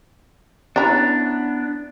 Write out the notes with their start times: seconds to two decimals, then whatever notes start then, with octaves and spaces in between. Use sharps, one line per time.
0.76 B3 C#4 D4 E4 A#5